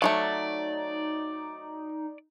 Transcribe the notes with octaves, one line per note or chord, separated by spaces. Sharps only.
F#3 G3 A3 D#4 D5